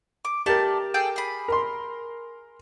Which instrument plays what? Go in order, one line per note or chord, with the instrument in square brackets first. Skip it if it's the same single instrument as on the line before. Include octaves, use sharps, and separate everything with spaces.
[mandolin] D6
[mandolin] A3 D5 A5 [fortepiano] G4 A#4
[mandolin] G#4 A4 G5
G#4 B5
[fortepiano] A#4 C6